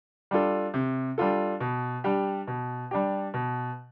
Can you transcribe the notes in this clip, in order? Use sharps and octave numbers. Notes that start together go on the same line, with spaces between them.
G3 D4 F4 A4
C3
G3 D4 F4 A4
B2
G3 D4 G4
B2
G3 D4 G4
B2